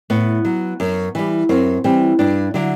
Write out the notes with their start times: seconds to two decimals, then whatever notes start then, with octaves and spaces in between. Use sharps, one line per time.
0.10 A2 B3
0.45 F#3
0.80 F#2
1.15 E3 G3
1.49 F#2 C4
1.84 E3 G3 C4
2.19 G2 D4
2.54 D3 F#3 E4